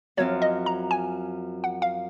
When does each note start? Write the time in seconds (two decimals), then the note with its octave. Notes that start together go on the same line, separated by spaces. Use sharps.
0.17 F#2 F3 C4 F4 C#5
0.42 D#5
0.66 A#5
0.91 G#5
1.64 F#5
1.82 F5